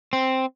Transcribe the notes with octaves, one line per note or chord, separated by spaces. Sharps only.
C4